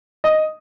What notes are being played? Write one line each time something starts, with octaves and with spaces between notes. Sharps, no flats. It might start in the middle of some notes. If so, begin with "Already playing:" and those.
D#5